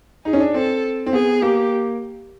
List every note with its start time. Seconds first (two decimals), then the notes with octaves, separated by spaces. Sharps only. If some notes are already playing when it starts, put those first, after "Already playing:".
0.25 D#4 G#4
0.33 C#4
0.40 D4
0.54 C4 A4
1.06 C4
1.13 B3 G#4
1.42 A#3 G4